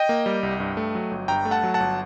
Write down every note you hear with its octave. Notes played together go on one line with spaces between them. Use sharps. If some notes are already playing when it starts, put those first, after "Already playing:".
Already playing: D#5 G5
A#3
G3
C2
G2
A3
F#3
G1
G2 G5 A#5
A3
F#5 A5
F#3
F#5 A5
G1